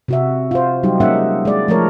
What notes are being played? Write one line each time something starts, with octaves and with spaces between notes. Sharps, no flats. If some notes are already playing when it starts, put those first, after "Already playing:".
C3 F#4 E5
F4 C5
F#3 G3 D#4 G4
G#3 A#3 C#4 D#4 E5 F#5
G#3 D5
F3 G#3 A3 A4 A#4 C#5